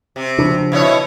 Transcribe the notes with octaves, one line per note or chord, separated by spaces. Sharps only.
C3
C#3 F3 D4
B2 E4 C#5